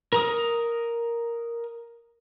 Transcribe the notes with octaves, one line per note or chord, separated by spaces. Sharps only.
A#4 A#5 D#6